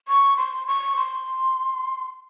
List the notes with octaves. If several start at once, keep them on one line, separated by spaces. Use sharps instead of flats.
C#6
C6
C#6
C6